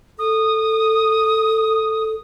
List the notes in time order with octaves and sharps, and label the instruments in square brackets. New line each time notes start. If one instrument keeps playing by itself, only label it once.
[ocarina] A4 [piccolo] D#6